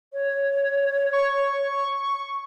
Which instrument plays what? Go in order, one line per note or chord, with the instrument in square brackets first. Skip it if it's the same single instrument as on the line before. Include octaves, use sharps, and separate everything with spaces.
[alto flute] C#5
[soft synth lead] C#6